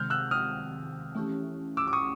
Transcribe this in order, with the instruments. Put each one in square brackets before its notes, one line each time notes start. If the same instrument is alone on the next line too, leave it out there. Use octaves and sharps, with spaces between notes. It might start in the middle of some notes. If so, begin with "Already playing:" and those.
Already playing: [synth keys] C3 D#3 G#3 C4 [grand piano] F6 G6
[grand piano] E6 F#6
D#6 F6
[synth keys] E3 A3 C#4 E4 G4
[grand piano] D6 E6
D6
C#6 D#6